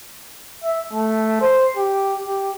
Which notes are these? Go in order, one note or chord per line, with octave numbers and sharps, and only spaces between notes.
E5
A3
C5
G4
G4